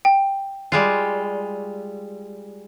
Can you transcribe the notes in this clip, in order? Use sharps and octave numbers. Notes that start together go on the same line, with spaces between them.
G5
G3 G#3 F4